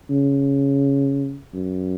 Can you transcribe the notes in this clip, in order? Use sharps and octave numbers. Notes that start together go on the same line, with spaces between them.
C#3
F#2